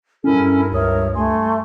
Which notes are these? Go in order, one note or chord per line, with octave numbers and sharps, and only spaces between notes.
G2 C#4 E4 A4 A#4
C#2 A#4 C#5 E5 D#6
A3 G#5 C6